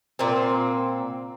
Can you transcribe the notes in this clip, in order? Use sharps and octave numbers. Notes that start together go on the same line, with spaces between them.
A#2 C4